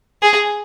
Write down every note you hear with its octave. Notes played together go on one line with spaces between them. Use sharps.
G#4